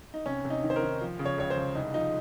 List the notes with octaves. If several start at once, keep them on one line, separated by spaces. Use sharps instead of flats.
D#4
C3 C#4
C3
D#4
D#3
C5
A#4
D#3
F3
C#3
C#5
C#2 C#5
C5
C#2
C2 D#4
F3 D#4